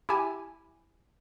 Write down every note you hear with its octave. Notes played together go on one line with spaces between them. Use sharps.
E4 G4 G#5